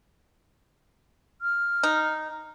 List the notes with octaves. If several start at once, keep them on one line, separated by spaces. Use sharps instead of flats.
F6
D#4